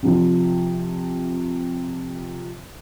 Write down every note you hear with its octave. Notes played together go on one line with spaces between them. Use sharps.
C3 F3